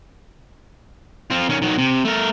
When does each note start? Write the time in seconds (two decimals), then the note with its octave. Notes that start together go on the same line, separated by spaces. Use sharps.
1.30 C4 F4
1.49 D#3 C#4
1.62 D#3 F#3
1.78 C3
2.05 A3 A#4